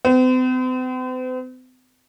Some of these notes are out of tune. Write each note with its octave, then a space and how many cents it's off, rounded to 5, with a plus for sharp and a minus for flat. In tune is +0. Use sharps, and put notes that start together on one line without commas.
C4 -45